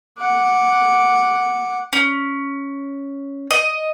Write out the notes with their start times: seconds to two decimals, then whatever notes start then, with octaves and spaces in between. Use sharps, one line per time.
0.19 F#5 D6
1.93 C#4
3.51 D#5